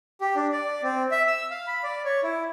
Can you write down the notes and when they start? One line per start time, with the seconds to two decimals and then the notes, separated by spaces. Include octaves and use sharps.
0.21 G4
0.36 D4
0.52 D5
0.83 C4
1.11 E5
1.27 E6
1.51 F5
1.67 B5
1.83 D5
2.05 C#5
2.23 E4